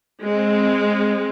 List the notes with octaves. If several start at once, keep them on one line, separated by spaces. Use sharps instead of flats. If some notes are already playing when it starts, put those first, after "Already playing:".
G#3 C4